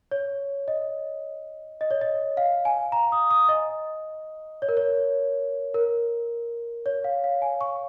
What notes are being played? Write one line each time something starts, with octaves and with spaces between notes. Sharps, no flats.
C#5
D#5
D#5
C#5
D#5
F5
G#5
A#5
D#6
D#6
D#5
C#5
A#4
C#5
A#4
C#5
F5
F5
G#5
C#6